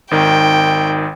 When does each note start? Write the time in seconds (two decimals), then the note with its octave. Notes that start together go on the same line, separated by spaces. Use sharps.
0.11 G#1 D#3 G5